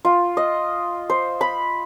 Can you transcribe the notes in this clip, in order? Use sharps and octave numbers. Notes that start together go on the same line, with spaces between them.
F4
D#5
C5
B5